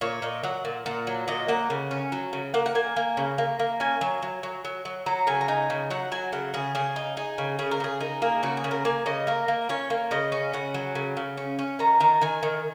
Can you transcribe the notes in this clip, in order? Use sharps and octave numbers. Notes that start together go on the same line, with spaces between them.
A#2 C#5
A#2 D#5
F#3 F#5
A#2
A#2 F#5
F#3
A#2 D#5
A#3 F#5
C#3
C#4
F#3
C#3
A#3 F#5
F#5
A#3 G#5
A#3
C#3
A#3
A#3
C#4 G#5
F#3
F#3
F#3
F#3
F#3
F#3 A#5
C#3 G#5
A#5
D#4 G#5
C#3
F#3 F#5
F#3 G#5
C#3 F#5
C#3 G#4
C#3 G#4
D#4
D#4 G#4
C#3
C#3 G#4
A#4
C#3 G#4
D#4 A#4
A#3 G#4
C#3 F#4
G#4
C#3
A#4
A#3 G#5
C#3 D#5
A#3 A#4
A#3
C#4 C#5
A#3
C#3 D#5
C#4
C#3 F#5
F#3
C#3
C#3
C#4
C#4
D#3 A#5
D#3 A#5
D#3 G#5
D#3